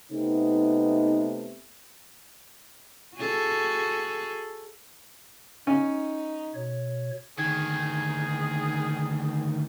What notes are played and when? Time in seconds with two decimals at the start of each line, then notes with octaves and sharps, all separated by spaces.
0.12 C3 A3 B3 D#4
3.17 F#4 G#4 A4
5.67 C#4 D#4
6.54 B2 C#5
7.39 D2 D#3 G#4 G#6